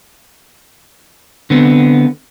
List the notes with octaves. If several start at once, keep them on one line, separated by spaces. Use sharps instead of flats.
D3 B3 C4